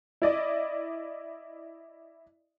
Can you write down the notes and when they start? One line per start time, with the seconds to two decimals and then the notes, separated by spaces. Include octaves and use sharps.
0.22 E4 D5 D#5